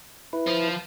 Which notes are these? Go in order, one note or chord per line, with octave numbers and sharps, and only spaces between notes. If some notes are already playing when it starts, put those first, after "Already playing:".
E4 B4
F3